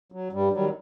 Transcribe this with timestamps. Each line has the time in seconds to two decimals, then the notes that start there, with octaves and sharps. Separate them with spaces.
0.12 F#3
0.32 G2 G3
0.53 D#3 F#3 G3